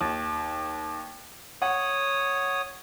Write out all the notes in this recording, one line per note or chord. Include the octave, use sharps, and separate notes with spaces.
D#2
C#5 F#5 D#6